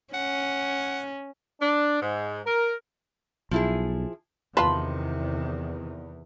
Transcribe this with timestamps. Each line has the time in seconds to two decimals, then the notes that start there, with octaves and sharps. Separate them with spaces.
0.14 C#4 F#5
1.61 D4
2.02 G#2
2.46 A#4
3.51 B1 F3 E4 G#4
4.57 E2 C3 D#3 F4 B4 A5 B5 C6